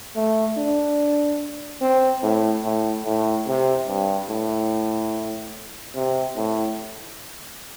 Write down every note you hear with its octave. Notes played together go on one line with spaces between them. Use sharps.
A3
D4
C4
A2
A2
A2
C3
G2
A2
C3
A2